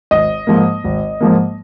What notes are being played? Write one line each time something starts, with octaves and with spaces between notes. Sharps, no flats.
G#1 D#5
G#2 F3 A#3
G#1
G#2 F3 A#3